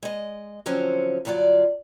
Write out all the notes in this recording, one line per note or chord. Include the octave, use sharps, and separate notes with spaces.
G#3 D#5
D3 F3 F#3 C4 C#4
G2 D3 F#3 F4 D5